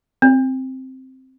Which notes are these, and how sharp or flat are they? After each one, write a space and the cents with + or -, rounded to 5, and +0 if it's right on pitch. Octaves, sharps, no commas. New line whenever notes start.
C4 +0